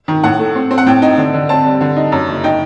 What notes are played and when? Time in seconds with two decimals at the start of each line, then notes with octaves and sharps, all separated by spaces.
0.08 D#3
0.24 A2 F#5
0.39 A3
0.55 C4
0.71 C4
0.78 F#5
0.86 A2 G5
1.02 D#4
1.18 D3
1.34 D3
1.49 C4 A5
1.65 G3
1.81 D3
1.96 D#4
2.12 F#2
2.28 F#1
2.44 D#4 G5